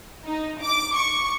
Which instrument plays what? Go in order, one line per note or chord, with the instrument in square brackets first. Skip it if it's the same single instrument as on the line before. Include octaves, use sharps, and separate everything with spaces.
[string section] D#4
D6
C#6